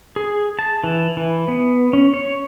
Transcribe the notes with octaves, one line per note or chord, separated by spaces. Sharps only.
G#4
A5
E3
E3
B3
C#4
C#5